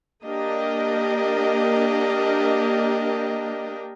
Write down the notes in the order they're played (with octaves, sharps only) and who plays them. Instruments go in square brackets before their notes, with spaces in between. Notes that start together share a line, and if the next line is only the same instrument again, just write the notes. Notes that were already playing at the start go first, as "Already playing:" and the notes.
[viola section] A#3 D4 G4 A#4 D#5